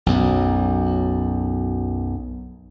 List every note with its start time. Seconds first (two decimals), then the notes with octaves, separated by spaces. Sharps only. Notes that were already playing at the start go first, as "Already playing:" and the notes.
0.06 B1 F#2